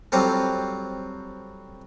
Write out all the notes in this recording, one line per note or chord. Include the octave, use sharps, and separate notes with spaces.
F#3 G3 C4 F4 A4